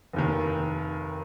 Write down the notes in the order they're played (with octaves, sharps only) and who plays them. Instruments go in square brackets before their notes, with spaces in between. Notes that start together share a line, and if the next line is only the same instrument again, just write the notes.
[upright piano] F1 D#2 D#3